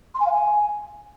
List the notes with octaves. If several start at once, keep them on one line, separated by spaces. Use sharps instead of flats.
C6
G#5
F5
G#5